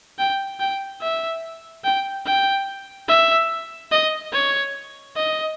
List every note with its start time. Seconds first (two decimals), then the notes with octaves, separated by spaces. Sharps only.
0.19 G5
0.60 G5
1.01 E5
1.84 G5
2.26 G5
3.08 E5
3.92 D#5
4.33 C#5
5.16 D#5